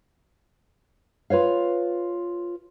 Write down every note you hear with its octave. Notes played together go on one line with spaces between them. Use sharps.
F4 B4 C#5 F5